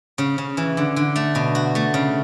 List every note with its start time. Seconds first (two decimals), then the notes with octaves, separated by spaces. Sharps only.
0.18 C#3
0.38 C#3
0.57 E3
0.77 D3
0.96 D3
1.16 A3
1.35 B2
1.55 F#4
1.75 A3
1.94 C#3